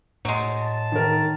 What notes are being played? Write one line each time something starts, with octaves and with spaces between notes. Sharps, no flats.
A2 F#3 G#3
A5
D#3 A#4